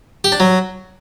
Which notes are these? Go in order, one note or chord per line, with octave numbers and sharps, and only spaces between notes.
G4
D4
F#3